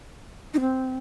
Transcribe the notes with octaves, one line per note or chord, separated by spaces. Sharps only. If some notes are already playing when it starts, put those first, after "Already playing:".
D#4
C4